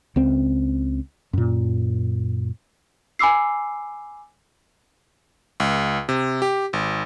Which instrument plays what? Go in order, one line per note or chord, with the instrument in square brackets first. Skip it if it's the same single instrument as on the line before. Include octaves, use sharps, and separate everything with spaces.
[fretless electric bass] C#2 C4
F#2 A#2
[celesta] G#5 B5 D6 E6 C7
[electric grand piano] C#2
C3
G4
G#1